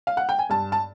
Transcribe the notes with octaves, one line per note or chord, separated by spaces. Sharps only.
F5
F#5
G5
G#5
G2 A5
A5